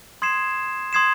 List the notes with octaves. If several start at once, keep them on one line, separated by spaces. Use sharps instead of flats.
C6 D#6 G#6 C7 E7
C6 D#6 G#6 C7 E7